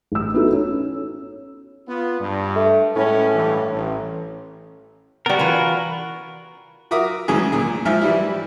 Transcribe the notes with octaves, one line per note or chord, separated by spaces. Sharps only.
A1 E6
B3 D#4 E4 F#4 A4
C#4
B3 F4
G2
A3
A2 G#3 C#4 B4
G2 E3
A1
G3 B3 F#4 A#4
E3 F4 B4
F#4 A#4 E5 D6 D#6
D2 G#2 E3 F#3 C#4 G#4
A#2 G#4
G#2 F3 E5 G#5 F6
E3 G3 E4